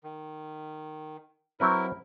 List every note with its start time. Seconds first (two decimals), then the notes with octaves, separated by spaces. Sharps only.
0.04 D#3
1.60 F#3 C4 E4 A#4 B4